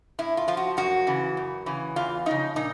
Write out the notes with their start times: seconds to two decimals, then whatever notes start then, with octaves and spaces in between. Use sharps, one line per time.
0.19 A2 E4
0.37 F4
0.48 F3 F4
0.57 F#4
0.77 F#2 F#4
1.07 C#3 E3
1.37 F#2
1.66 C#3 E3
1.96 E2 F4
2.26 C#3 F3 D#4
2.56 A#2 D#4